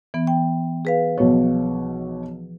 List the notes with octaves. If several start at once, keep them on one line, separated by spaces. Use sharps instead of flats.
E3 B3
G5
G#4 B4 F5
B1 B2 F3 C#5